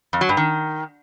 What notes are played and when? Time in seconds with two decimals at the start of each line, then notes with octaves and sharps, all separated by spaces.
0.13 F2
0.21 F#3
0.29 G2
0.37 D#3